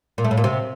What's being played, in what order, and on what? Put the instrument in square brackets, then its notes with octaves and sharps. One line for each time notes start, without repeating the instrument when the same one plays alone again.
[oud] A#2
A3
A2
A#2
C3